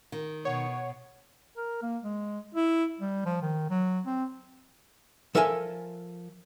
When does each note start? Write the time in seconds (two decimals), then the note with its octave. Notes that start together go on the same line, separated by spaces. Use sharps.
0.12 D#3
0.45 B2 C#5 F#5
1.56 A#4
1.82 A#3
2.03 G#3
2.54 E4
2.99 G3
3.25 F3
3.42 D#3
3.70 F#3
4.06 C4
5.35 F3 A4 A#4 E5 F#5 G#5